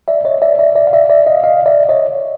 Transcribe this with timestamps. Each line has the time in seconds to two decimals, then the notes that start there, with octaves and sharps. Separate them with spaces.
0.08 D5 E5
0.25 C#5 D#5
0.42 D5 E5
0.59 D5 E5
0.76 D5 E5
0.87 F5
0.93 D5 E5
1.10 D5 E5
1.27 D#5 F5
1.44 D#5 F5
1.66 D5 E5
1.89 C#5 D#5